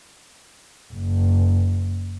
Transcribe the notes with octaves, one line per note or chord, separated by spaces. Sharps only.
F#1